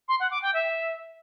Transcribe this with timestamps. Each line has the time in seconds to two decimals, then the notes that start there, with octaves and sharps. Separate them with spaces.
0.08 C6
0.20 F#5
0.31 D6
0.42 G5
0.54 E5